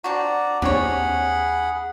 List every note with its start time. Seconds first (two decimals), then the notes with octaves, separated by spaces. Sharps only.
0.04 C4 D4 F#4 D5 A#5
0.62 D#2 C4 D4 G4 G#4 C#5 F#5 B5